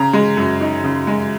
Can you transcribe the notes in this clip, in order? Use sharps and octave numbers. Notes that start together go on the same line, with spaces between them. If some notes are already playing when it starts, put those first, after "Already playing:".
Already playing: C#3 A#5
G#3
F#2
D#4
C#3
G#3